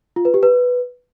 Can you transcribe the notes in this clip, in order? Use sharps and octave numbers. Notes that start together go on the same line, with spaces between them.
F4
B4
G4
B4